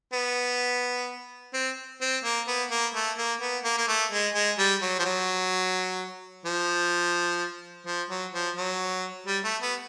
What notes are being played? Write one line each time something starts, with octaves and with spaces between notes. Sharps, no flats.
B3
C4
C4
A#3
B3
A#3
A3
A#3
B3
A#3
A#3
A3
G#3
G#3
G3
F#3
F3
F#3
F3
F3
F#3
F3
F#3
G3
A3
B3